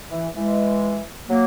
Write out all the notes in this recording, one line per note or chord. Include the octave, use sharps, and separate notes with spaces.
E3
E3 G#3
F#3 A#3